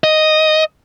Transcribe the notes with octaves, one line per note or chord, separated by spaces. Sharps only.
D#5